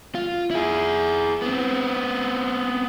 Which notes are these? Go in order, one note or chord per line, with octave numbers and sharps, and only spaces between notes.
F4
E4 G#4
B3 C4